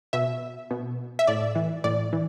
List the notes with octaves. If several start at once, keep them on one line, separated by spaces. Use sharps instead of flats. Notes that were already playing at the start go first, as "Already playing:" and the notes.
B2 E5
B2
E5
A2 D5
E3
A2 D5
E3